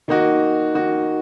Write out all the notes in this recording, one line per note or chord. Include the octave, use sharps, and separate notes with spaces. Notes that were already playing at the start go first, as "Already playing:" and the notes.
D#3 A#3 D#4 F#4
D#3 A#3 D#4 F#4